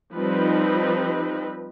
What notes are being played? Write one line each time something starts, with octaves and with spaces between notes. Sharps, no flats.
F3 G3 C4 D#4 B4